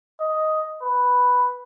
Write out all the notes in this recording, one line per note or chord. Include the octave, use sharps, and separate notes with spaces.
D#5
B4